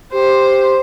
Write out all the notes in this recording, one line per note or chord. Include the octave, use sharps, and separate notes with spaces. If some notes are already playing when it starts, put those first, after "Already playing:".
G4 C5